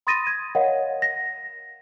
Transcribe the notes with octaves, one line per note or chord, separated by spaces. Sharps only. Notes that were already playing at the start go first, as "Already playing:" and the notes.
B5 C6 D#6 A6 A#6 D#7
G#6
A#4 C#5 D#5 F5 F#5
A#6